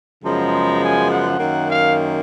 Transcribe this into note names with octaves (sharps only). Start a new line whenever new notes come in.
F#2 C#3 F3 G#3 B3 A#5
G#5
F#5
F#2 D#3 A#3
F5